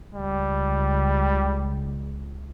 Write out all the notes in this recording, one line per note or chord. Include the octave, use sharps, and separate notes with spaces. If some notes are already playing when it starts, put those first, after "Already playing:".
C#2 G3